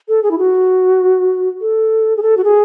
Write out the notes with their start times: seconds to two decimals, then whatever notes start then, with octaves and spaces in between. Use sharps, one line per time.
0.08 A4
0.23 G#4
0.31 E4
0.38 F#4
1.61 A4
2.17 G#4
2.22 A4
2.37 F#4
2.44 G#4